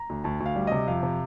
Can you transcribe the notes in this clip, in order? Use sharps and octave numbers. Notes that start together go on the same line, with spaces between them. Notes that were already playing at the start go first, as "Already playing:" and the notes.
Already playing: A#5
D2
D2 A5
D2
F5
G3
C3 D#5
F2 F5
C3